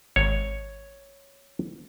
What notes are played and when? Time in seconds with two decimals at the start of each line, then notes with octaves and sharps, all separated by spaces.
0.16 G#1 C#5